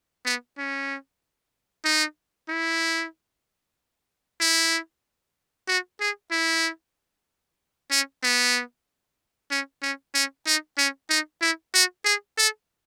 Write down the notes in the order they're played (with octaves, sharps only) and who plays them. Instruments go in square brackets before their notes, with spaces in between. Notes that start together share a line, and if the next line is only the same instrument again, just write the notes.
[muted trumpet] B3
C#4
D#4
E4
E4
F#4
G#4
E4
C#4
B3
C#4
C#4
C#4
D#4
C#4
D#4
E4
F#4
G#4
A4